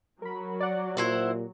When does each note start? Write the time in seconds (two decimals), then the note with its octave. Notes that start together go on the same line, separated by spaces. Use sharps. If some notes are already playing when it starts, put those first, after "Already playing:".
0.22 F#3 A#4 B5
0.60 D5 F#5
0.97 A#2 E4 G4 C5 F#5